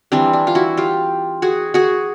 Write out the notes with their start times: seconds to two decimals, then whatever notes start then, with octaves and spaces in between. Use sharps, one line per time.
0.12 E3 G3 C4 D4
0.33 D4
0.47 F4
0.55 E4 F#4
0.77 F4 G4
1.42 F#4 G#4
1.74 F#4 G#4